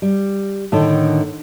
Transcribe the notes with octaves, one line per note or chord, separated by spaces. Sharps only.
G3
A2 D3 D#3